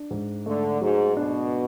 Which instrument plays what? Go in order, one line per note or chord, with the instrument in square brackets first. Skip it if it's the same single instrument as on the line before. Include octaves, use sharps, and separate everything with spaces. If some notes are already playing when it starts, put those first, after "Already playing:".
Already playing: [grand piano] D4
G#2
[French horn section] D3 [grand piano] A3
[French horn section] G#2 [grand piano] F#3
[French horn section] B2 [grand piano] D4